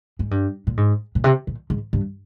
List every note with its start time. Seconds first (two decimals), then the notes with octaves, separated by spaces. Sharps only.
0.19 G#2
0.31 G2
0.67 A#2
0.77 G#2
1.15 A#2
1.24 C3
1.47 A#2
1.70 G#2
1.93 G2